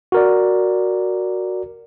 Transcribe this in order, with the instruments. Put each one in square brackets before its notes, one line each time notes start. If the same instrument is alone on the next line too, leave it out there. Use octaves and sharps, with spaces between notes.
[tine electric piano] F#4 A#4 D5